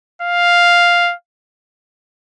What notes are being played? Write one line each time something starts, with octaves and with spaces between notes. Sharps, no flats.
F5